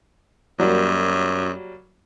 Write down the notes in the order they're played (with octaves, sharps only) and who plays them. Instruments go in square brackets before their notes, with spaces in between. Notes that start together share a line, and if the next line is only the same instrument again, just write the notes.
[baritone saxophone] F#2 [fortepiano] F#3 G3 A#3